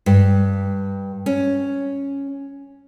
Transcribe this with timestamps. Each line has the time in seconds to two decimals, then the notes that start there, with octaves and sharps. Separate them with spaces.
0.06 G2
1.26 C#4